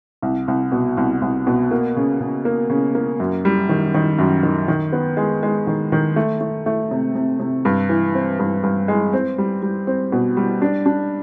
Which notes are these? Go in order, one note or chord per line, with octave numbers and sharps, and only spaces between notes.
C2
C2
B2
C2
C2
B2
A#3
C#3
C#3
A#3
C#3
A#3
F#2
G3
D#3
D#3
F#2
D#3
D#3
B3
G#3
G#3
D#3
D#3
A3
A3
A3
C3
C3
C3
G2
E3
C4
G2
G2
G#3
C4
G3
G3
C4
B2
G3
D4
D4